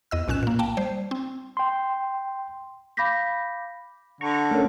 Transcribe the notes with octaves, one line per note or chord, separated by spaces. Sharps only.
E2 D#5 E6
B1 A#2 C#4 F#6 E7
A#2 A#3
A#3 G5 A5
G3 C5
C4
G5 C6
F5 B5 D6 G6 A#6 B6
D3 A#5 C#6
A3 C#4 A#4